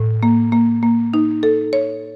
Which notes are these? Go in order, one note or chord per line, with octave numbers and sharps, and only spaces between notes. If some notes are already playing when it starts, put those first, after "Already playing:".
Already playing: A2
A#3
A#3
A#3
D#4
A4
C#5